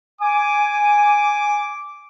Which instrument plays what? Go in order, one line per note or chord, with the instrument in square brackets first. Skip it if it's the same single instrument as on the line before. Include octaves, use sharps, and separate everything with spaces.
[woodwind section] G#5 [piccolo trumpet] D6